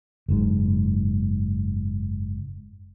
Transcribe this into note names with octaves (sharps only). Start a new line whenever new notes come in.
F#1 G#2